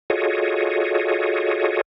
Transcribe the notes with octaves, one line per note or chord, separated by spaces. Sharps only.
F4 F#4 G#4 A4 C#5 D#5